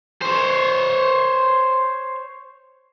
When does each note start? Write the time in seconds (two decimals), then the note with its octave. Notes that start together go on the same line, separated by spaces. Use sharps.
0.22 C5 C#5